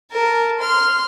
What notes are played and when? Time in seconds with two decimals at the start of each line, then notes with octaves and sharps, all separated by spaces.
0.12 A#4 A5
0.59 C6 F6